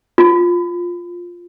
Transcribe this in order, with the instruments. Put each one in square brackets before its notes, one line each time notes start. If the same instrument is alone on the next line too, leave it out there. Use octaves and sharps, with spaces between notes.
[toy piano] F4